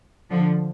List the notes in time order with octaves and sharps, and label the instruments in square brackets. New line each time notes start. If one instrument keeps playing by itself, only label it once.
[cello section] D3 F3